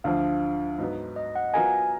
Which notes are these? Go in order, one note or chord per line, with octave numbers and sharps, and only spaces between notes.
D2 D3 F3 F5
G#2 F#3 B3
D#5
F#5
F#3 B3 F4 A#4 D#5 G#5